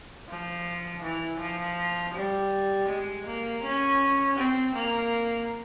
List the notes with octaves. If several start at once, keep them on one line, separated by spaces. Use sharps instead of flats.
F3
E3
F3
G3
G#3
A#3
C#4
C4
A#3